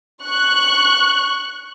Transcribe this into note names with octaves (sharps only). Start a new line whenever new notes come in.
C#6 F#6